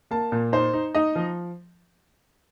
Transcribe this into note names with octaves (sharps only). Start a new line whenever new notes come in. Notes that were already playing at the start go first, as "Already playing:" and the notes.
A#3 A5
A#2
D#4 C5
D#4
D#4 D#5
F3